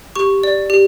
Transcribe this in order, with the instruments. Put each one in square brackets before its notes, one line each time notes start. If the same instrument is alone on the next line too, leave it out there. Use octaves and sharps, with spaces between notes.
[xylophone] G4 C#6
D5
G4